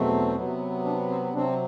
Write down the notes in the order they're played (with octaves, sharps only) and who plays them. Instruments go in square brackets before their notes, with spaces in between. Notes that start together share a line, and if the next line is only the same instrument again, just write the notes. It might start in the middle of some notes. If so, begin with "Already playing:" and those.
Already playing: [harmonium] E2 B2 F#3 A3 C4
C3 F#3 B3
D4
C4
C3 F#3 C4 D4